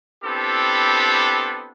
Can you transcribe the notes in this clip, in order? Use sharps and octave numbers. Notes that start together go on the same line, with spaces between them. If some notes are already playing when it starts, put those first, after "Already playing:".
B3 C4 D4 E4 G4 A4